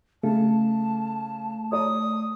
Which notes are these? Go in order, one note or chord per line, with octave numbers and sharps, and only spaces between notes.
C#3 A3 A5
C#5 D5 A#5 D#6